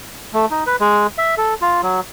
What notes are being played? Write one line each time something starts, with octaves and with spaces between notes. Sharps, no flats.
A3
D#4
B4
G#3
E5
A4
F4
F#3